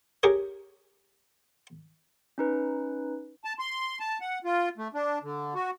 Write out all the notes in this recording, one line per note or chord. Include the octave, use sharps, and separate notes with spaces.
G4 G#4 A#4 C#5
C#4 D#4 B4
A5
C6
A5
F#5
F4
A3
D4
D3
F#4